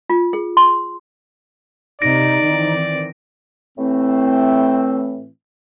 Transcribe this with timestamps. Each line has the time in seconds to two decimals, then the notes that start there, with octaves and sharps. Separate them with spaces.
0.10 F4
0.33 G#4
0.57 C6
2.02 C3 D#4 D5 A#6 D7
2.42 D#3 E3 C4
3.78 A2 E3 A3 C4